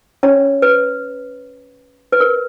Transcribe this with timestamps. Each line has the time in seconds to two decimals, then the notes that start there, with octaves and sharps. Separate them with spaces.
0.23 C#4 C#5
0.62 B4
2.12 B4
2.20 A#4